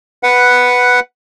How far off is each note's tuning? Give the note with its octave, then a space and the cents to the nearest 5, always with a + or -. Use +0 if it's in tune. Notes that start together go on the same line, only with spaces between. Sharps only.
B4 +0 F#5 +0